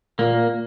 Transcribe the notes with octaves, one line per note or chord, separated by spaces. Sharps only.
A#2 A#3